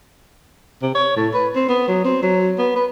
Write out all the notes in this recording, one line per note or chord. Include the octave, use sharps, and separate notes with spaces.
C3
C#5
A2
B4
C4
B3
F#3
C4
F#3
B3
B4